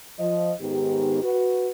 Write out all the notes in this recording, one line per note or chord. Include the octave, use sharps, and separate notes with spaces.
F3 D#5
G#2 D#3 B3 G4
F#4 B4